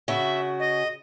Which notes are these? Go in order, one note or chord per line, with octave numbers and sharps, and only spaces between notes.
C#3 F#4 E5
D#5